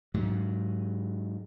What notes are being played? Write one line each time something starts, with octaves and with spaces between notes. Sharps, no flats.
G#2 F#3